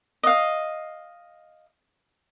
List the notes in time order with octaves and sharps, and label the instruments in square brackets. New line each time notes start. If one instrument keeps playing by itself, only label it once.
[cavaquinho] D#5 F5